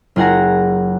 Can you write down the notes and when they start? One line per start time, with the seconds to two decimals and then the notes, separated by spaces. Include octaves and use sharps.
0.16 F#1 F4 G#4 F#5 A#5